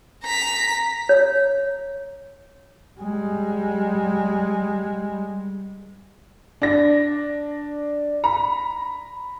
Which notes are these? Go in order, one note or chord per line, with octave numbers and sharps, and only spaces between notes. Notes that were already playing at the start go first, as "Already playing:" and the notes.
A#5 B6
C#5
G3 G#3
D4 A#6
A#5 B5